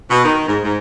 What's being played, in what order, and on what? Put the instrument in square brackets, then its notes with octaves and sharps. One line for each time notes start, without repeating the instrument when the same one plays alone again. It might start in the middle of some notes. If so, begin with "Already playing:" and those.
[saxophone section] B2
D#3
G#2
G#2